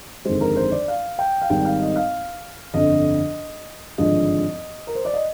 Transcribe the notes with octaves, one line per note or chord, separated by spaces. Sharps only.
G1 F2 D#3 G#3 C5
A#4
C5
D5
F5
G5
F5
G#1 G#2 G3 G5
F5
D#5
F5
G1 F2 D3 D#5
G#1 G2 D3 F3 G#3 D#5
A#4
C5
D5
D#5